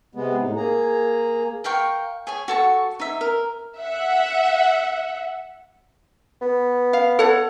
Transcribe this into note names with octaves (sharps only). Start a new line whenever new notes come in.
C3 G#3 B3
A2 D#4
A#3 G#4 A#5
A#4 F5 G5 C#6
G#4 C#5 G#5
F#4 A4 C#6
D#4 E5
A#4
E5 F#5
B3
F5
A4 C#5 F#5